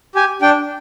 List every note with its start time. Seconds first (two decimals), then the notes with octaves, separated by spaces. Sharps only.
0.15 G4 G#5
0.42 D4 G5